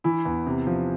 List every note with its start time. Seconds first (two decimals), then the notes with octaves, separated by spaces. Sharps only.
0.04 E3 E4
0.25 E2
0.47 C3
0.67 F3